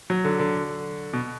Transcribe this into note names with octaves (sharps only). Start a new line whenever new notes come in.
F#3
D3
D3
B2